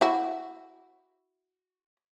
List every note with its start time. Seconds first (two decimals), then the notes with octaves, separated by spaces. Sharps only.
0.01 E4 F#4